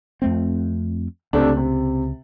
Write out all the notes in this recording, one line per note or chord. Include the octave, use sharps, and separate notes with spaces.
F2 A3 C4
C#2 C3 A3 D4
C3